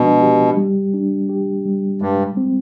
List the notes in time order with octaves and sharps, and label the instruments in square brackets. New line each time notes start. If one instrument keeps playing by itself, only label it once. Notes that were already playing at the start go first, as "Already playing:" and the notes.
Already playing: [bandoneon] B2 [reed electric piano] F3 G#3 D4
[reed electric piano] G4
G3
D4
G4
G3
[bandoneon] G2 [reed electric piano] G#3
[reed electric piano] C4